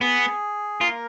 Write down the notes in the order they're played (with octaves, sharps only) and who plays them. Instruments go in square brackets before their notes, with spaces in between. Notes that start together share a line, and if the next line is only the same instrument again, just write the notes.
[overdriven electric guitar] B3 [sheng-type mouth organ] G#4
[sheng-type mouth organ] A#3 A#4 [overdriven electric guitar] F4